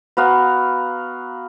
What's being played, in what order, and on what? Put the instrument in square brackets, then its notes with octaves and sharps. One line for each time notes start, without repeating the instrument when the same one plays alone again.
[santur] B3 F#4 F5 A#5